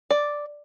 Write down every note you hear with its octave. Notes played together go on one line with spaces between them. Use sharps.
D5